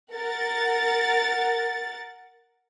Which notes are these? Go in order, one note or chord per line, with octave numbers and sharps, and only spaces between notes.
A#4 F#5 A6